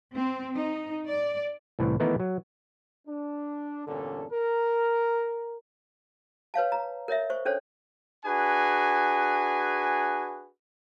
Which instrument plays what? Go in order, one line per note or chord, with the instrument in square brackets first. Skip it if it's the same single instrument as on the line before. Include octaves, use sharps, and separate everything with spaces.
[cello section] C4
D#4
D5
[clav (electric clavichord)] C2 A2 E3
D#3 E3 A3 B3 D#4 E4
F#3
[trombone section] D4
E2 G2 A#2 D3 C#4 A4
A#4
[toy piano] B4 C#5 F5 A5
A#5
A#4 C#5 D#5 E5
C5 C#6
C#4 D4 A4 C5 C#5
[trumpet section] D4 F#4 G#4 B4 G#5